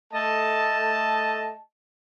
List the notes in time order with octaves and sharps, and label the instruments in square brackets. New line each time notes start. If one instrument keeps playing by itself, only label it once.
[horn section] A3 D#5 A5